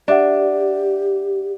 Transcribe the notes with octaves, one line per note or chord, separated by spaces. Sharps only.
D4 G4 D5 E5 F#5